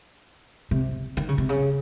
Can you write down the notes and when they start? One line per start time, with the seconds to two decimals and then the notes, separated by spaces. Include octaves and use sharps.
0.71 C3
1.17 D#3
1.28 C#3
1.38 C3
1.49 C#3